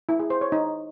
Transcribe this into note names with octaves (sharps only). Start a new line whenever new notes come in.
E4
G#4
C5
C#5
D#4